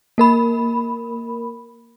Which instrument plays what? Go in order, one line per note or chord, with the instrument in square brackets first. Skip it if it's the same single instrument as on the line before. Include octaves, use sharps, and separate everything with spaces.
[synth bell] A#3 A#4 B5